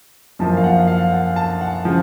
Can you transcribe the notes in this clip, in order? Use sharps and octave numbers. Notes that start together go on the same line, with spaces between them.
F#2 F3 A#3 A5
F5
F#5
F5
F#5
A5
F#5
C#3 F3